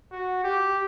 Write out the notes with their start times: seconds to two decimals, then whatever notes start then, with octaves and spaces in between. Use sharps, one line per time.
0.11 F#4
0.43 G4